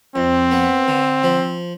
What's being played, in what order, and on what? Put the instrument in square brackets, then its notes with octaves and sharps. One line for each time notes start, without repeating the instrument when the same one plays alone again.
[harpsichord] F2 [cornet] C4
[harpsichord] B3
D3
F3